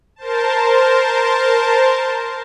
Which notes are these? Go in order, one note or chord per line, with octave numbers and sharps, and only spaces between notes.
A#4 C5 A5